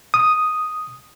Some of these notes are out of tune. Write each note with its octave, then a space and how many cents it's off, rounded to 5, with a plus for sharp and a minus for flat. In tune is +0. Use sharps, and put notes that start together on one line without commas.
D#6 +0